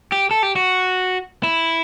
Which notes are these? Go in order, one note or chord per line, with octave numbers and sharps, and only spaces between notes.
G4
A4
G4
F#4
E4